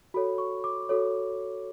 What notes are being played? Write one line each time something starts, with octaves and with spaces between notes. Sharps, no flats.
F#4 A4 C#5 B5
C#6
D6
F#4 A4 C#5